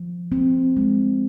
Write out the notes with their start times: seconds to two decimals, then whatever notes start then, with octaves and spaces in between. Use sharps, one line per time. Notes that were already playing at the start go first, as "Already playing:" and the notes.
Already playing: F3
0.32 C4
0.77 G#3